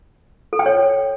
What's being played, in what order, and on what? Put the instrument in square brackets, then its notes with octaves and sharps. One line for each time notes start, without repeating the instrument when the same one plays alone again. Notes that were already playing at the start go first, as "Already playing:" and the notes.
[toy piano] A4
G5
C#5